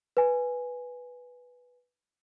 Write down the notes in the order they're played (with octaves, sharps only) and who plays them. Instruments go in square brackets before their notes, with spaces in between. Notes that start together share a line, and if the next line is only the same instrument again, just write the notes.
[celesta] B4 G#5